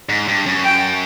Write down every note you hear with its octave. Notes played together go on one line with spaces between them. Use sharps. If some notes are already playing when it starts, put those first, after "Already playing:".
G#2
G2
F#2
G5